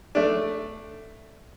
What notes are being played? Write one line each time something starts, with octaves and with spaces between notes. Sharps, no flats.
A3 D4